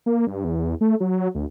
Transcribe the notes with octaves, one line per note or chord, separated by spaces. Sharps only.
A#3
G2
E2
A3
F#3
D2